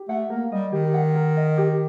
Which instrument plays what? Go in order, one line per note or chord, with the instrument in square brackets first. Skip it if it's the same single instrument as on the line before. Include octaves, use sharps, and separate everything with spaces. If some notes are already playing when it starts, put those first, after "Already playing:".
Already playing: [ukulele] G4
[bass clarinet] A3 [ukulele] F#5
[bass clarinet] A#3 [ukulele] A#4
[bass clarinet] G3 [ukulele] D#5
[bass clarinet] D#3 [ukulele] G4
[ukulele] F#5
A#4
D#5
G4